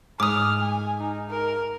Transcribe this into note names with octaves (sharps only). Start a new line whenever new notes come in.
G#2 D6 D#6 F6
G#5
D#4
A#4